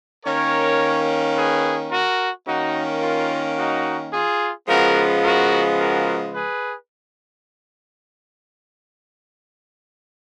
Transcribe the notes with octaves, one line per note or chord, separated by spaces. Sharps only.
D#3 A#3 C#4 A#4 C#5
G#4 B4
F#4 A#4
D#3 A#3 C#4 D#4 F#4
F4
D#4 F#4
F4 G#4
C#3 F3 G#3 B3 F#4 A#4
F#4 A#4
F#4 A#4
G#4 B4